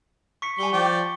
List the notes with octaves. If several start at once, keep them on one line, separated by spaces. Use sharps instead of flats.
C#6 B6 C#7
G3 G#5 G7
F3 D5 G5